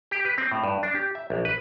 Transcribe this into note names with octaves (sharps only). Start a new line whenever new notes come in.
G4
B4
C4
A2
G2
D4
G4
E5
A#1
B4